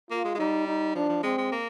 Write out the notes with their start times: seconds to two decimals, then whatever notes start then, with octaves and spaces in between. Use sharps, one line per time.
0.11 A#3 F4
0.25 G#3
0.35 G#3
0.38 G3 D#4
0.67 D#4
0.95 F3 D4
1.09 F3
1.23 G#3 C4
1.38 G#3
1.52 A#3